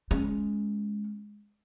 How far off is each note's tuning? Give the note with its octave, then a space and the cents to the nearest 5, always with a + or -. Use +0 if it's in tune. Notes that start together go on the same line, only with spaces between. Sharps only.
G#3 +0 C#4 +0